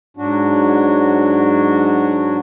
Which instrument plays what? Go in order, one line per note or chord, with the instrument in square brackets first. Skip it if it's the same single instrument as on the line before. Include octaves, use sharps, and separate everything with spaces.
[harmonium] G#2 F#3 D4 F#4